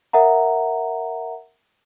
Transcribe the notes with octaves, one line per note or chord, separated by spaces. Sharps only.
A#4 E5 F#5 A#5